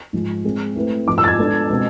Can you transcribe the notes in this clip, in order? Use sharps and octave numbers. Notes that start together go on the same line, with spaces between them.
G#2 F3 G#3
G#3 C4 G#4
A3 C4 E4 B4
G#2 F3 G#3 D6
E6
A6
G#6
G#3 B3 D4 A4 D5
B2 G#3 C4